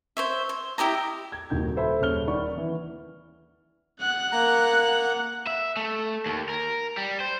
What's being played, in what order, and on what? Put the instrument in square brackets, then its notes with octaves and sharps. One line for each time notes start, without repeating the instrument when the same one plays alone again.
[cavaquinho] C5 C#5 E5
C5
E4 G4 D#5 A#5
[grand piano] G#6
D#1 D#3 F#4 G6
A4 C5 E5 B5
D#1 C#3 C#5 F6 G7
D#3 D5 F#5 B5 C#6
E3
[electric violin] F#5 F#6
[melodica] A#3 A#5
[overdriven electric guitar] E5
A3
D#2
A#4
G3
C5